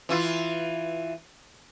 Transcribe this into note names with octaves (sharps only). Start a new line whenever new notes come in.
E3 E4 F4